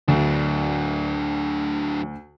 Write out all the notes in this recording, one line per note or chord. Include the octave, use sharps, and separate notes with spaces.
D2 F#3 D4